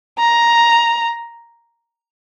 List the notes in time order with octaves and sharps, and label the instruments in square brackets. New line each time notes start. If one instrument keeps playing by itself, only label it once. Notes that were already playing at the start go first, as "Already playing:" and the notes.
[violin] A#5